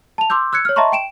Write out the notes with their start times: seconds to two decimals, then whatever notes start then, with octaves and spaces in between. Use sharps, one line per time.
0.18 A5 F7
0.30 C6 D6 E6 G6
0.53 E6 F#6 G#6 C#7
0.65 C#5 F6
0.76 D#5 E5 A5 A#5 C6 C#6
0.92 G5 D7 E7